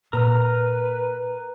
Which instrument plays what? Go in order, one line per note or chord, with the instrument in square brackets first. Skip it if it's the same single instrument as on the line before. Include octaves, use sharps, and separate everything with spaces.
[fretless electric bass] A#2 [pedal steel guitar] A#4 A#5 F6 [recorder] B4